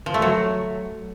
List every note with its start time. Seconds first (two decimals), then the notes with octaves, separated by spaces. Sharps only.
0.06 F3
0.14 A3
0.22 F#3